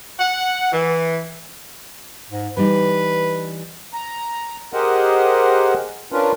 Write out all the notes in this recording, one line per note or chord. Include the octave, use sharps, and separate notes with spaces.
F#5
E3
G#2
E3 G3 D#4 B4
A#5
G4 G#4 A#4 C5 D#5 F#5
C#4 D4 F4 A#4 B4